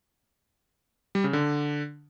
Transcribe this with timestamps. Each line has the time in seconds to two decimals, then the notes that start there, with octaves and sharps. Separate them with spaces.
1.15 G3
1.24 C#3
1.33 D3